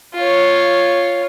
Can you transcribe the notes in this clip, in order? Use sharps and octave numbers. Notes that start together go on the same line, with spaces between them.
F4 C#5